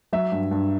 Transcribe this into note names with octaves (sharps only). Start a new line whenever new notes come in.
F#3 E5
G2
G2